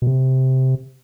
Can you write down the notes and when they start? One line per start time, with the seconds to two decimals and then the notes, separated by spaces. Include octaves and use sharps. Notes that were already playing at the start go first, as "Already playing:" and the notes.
0.02 B2
0.07 C3